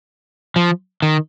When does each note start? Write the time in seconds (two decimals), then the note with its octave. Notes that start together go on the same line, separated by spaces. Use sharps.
0.56 F3
1.02 D#3